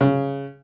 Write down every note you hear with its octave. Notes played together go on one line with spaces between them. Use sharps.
C#3